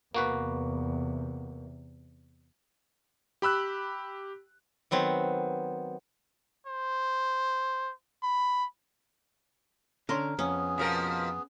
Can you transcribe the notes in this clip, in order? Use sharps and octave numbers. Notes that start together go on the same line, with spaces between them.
E2 C3 A#3 F#4 B4
G4 B5 E6 F#6
D#3 F#3 B3 C4
C5
B5
D3 C#4 A#4 C6
F2 B3 C#4 G#4
B2 F3 A#4